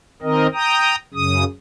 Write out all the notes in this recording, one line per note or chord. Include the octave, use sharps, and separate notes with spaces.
D#3 C4 A#4 D#5
G5 A#5 D#6
F#2 C#3 D#6